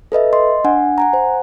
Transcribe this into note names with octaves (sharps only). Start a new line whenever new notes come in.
A4 B4 D#5 E5
D#5 C6
D4 F#5 G#5
F#5 G#5 A#5
C5